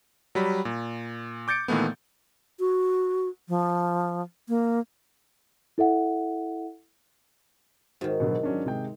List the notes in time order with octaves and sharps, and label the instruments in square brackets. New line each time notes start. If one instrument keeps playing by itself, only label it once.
[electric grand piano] F#3 G3 B5
A#2
D6 G6 A6 C#7 D7
A#2 D#3 E3 A3 B3
[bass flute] F#4
F3
A#3
[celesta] E4 A4 E5 F#5
[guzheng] G#2 D#3 [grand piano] F#4
[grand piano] B2 D3 F#3
F#3 C#4 D4
C3 G#3 G5